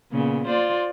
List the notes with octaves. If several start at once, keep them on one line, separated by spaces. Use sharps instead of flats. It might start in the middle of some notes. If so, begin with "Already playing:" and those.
A#2 C#3 B3
F4 C5 D5